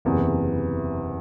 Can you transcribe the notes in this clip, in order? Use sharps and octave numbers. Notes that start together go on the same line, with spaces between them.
F#1 E2 C3 E3